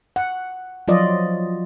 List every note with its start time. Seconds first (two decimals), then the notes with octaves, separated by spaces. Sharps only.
0.16 F#5
0.88 F3 F#3 F4 D5 D#5